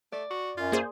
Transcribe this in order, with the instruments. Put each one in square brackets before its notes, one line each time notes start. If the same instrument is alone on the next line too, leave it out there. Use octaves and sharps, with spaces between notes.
[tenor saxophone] A3 [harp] D5
[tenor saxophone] F#4
[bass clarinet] F#2 [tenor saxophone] F4
[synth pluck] A#3 G#4 C5